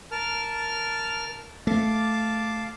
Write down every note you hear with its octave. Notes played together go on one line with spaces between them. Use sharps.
A#4 A5 F6
A3 F5 A5 D6